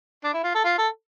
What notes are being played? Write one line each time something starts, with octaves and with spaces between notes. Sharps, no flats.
D4
E4
F4
A4
F4
A4